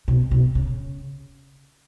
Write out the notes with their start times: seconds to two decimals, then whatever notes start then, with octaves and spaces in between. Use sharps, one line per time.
0.08 B2
0.31 B2
0.55 C#3